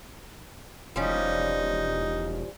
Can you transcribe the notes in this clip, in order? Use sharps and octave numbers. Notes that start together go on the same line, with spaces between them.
E1 F3 G3 C#4 D#4